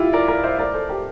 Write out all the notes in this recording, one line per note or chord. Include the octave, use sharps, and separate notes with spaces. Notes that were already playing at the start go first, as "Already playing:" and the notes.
Already playing: E4 F4 G4
A#4 D5
A#4 D5
C5 E5
A#4 D5
A4 C5
G4 A#4